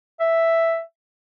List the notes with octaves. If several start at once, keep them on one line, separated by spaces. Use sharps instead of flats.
E5